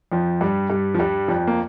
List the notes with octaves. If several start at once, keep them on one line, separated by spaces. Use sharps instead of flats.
F2 F3
G2 G3
G2 G3
F3
G2 G3
F2 F3
A#3